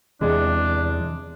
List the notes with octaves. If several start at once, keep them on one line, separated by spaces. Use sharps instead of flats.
E2 C3 E3 G#3 D4